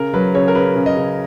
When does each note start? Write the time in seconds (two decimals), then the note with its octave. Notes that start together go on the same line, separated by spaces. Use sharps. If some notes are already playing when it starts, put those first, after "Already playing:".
Already playing: C#3 A#4
0.13 F#3 B4
0.34 C#3 C#5
0.48 A#4
0.55 C#3 B4
0.75 C#3
0.86 D#5
0.96 C#3